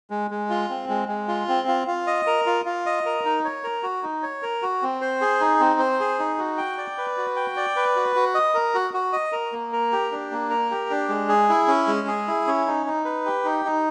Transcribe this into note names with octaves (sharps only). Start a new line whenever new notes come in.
G#3
G#3
F4
C4
G#3
G#3
F4
C4
F4
F4
D#5
A#4
F4
F4
D#5
A#4
D#4
C#5
A#4
F#4
D#4
C#5
A#4
F#4
C4
C5
G#4
D#4
C4
C5
G#4
D#4
F#4
G5
D5
B4
F#4
G5
D5
B4
F#4
F#4
D#5
A#4
F#4
F#4
D#5
A#4
A#3
A#4
G4
D4
A#3
A#4
G4
D4
G#3
G#4
E4
C#4
G#3
G#4
E4
C#4
D#4
D#4
B4
G4
D#4
D#4